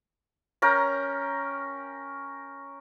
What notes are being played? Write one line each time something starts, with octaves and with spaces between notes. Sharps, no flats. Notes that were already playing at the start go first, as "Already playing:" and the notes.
C#4 A#4 G5 A#5